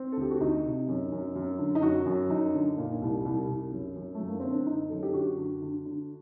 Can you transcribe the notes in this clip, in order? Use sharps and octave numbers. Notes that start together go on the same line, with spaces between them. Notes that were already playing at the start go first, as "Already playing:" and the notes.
Already playing: C4
A4
D2 G4
F#4
D2 D#4
C3
F#2
F#2
F#2
D3
D#4
F#2 F#4
F#2
F#2 D#4
D3
A#2
C2
C2
C2
F#2
F#2
F#2 A3
A#3
D3 C4
D4
D3 D#4
F#2 A4
G4
D3 F#4
D3
D3
D3